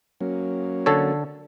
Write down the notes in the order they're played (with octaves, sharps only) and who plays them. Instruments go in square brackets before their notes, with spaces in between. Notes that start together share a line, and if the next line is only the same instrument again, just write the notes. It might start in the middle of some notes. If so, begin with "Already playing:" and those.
[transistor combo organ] F#3 A#3 C#4
[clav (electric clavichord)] D3 A4 C#5